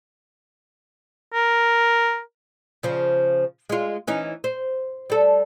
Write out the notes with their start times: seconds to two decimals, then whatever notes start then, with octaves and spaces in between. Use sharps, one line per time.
1.34 A#4
2.83 C#3 F3
3.69 G#3 F4
4.07 E3 C#4 D#4
4.44 C5
5.10 G3 A4